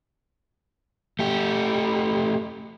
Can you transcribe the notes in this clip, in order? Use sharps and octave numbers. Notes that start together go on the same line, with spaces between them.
A3 G4